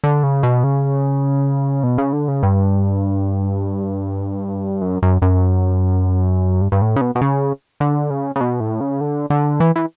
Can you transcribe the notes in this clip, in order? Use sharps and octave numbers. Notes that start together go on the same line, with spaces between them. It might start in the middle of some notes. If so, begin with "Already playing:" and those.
D3
C#3
B2
C#3
B2
C#3
D3
C#3
G2
F#2
F#2
F#2
G2
G2
A2
C#3
B2
B2
C#3
D3
C#3
C#3
B2
A2
C#3
D3
D3
E3
E3